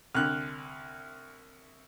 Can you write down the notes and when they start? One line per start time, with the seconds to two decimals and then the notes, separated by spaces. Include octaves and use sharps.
0.15 C2 D3 F6 F#6